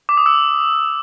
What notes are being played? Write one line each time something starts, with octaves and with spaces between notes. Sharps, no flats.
D6
D#6
E6